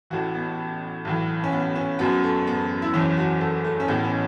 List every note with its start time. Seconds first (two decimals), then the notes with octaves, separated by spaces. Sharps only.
0.10 A1 A2 E3 F#4
0.35 B3
1.05 B1 A2 E3
1.44 C#4
1.52 B3
1.76 C#4
1.99 F#1 F#2 F#3 B3
2.23 A3
2.47 B3
2.82 E4
2.94 F#1 E2 E3 C#4
3.17 F#4
3.41 A4
3.64 A3
3.80 C#4
3.88 A1 A2 E3 B3
4.04 C#4